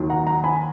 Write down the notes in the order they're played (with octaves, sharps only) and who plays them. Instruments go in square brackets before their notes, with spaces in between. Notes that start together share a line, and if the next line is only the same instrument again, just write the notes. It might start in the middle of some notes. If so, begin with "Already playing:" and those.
Already playing: [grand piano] D#2 D#3 F#3 A#3
F#5 A#5
F#5 A#5
G#5 B5